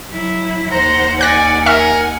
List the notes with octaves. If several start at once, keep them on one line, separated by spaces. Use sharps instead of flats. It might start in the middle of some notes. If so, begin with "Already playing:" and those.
F#3 E4
D#2 C5 F#5 A#5
D5 G#5 F#6 A#6
A#4 E5 G#5 C#6 F6